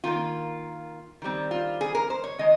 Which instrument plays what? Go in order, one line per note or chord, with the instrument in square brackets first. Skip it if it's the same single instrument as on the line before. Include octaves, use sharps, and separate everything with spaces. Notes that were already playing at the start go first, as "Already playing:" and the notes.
[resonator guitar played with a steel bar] D#3 A#3 F4
D#3 G3 C4
F4
G#4
A#4
C5
C#5
D#3 G#3 D#5